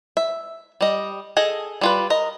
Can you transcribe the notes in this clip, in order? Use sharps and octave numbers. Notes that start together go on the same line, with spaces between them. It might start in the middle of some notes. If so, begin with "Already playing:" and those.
E5
G3 D#5
G#4 A4 D#5
G3 F4 B4
A#4 D#5